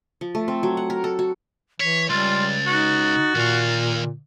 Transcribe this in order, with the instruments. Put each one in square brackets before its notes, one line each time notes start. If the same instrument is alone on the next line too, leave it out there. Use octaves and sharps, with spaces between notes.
[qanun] F3
A3
C4
F#3
F#5
A#4
A4
F#4
[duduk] E3 [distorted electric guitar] C#5 [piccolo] B6
[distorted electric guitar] C#2 [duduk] G3 [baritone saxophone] F4 [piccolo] A6
[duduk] D#4 [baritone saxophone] F#4
[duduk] A#2 [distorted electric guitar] D#3 F5